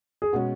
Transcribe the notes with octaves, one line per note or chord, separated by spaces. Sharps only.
G#4
B2 G#3 C#4 F#4